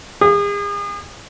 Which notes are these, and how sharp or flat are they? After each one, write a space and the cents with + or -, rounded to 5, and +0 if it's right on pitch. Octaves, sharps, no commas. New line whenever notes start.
G#4 -40